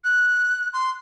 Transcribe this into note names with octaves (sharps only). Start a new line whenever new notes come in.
F#6
C6